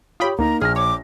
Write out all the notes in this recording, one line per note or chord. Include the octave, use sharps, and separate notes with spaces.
F4 G4 C#5 G5 B5 D#6
D2 A#3 D#4 A#5
A#1 G#4 F6 A#6
C#5 D6